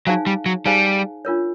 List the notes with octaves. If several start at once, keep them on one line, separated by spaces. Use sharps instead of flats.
F#3 D#4 G#4 C5 F5 G#5
G3
F#3
G3 D#4 G#4 C5 F5 G#5
D4 F4 A#4 C#5